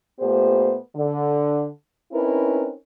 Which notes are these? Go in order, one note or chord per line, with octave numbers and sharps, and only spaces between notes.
A#2 A3 B3 G4 C5
D3
C4 C#4 D#4 E4 A#4 B4